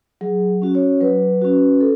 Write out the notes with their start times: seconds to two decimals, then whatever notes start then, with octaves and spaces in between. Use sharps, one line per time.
0.21 F#3 G#4
0.62 C#4 F#4
0.75 C#5
1.00 F#3 B4
1.42 C#4 F#4
1.81 A4